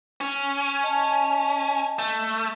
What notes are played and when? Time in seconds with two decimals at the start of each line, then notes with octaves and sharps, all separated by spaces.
0.21 C#4
0.83 D#5 A5
1.99 A3